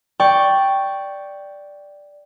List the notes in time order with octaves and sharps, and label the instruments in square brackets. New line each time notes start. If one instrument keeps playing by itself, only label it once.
[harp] D5 G5 C#6